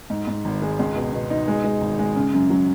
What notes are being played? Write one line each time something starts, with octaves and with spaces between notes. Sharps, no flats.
G#2
G#2
G#1
G#3
C#2
B2
B2
D#4
G#3
G#3
G#1
G#3
C#3
F#2
F#3